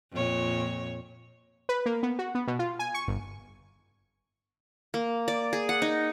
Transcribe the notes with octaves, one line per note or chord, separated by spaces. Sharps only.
F2 A#2 C#5
B4
A#3
B3
F#4
B3
B2
F4
G#5
C#6
G1
A#3
D5
G#4
F#5
D#4